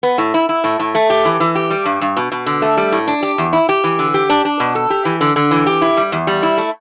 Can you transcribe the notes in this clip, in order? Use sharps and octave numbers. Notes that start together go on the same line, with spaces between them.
B3
A2
E4
E4
A2
A2
A3
G4
E3
E3
G4
G3
G2
G2
B2
B2
D3
A3
G3
A2
D4
G4
E2
E4
G4
E3
D3
G4
D4
D4
B2
A4
G4
E3
D3
D3
E3
G4
E4
G3
E2
G3
E4
A3